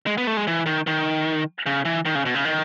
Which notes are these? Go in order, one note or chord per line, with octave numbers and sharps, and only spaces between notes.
G#3
B3
A3
G#3
E3
D#3
D#3
C#3
E3
D#3
C#3
B2
C#3
D#3